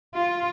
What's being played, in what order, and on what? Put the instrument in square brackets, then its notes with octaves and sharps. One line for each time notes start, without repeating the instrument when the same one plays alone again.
[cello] F4